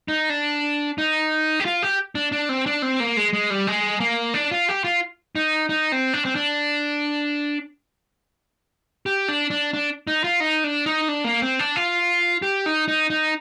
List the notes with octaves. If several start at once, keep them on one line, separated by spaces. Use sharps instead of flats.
D#4
D4
D#4
G4
F4
G4
D4
D4
C4
D4
C4
A#3
G#3
G#3
G3
G#3
A#3
D4
F4
G4
F4
D#4
D#4
C4
D4
C4
D4
G4
D4
D4
D4
D#4
F4
D#4
D4
D#4
D4
A#3
C4
D4
F4
G4
D#4
D#4
D#4